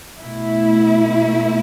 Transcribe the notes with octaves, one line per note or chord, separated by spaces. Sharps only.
B2 A3 E4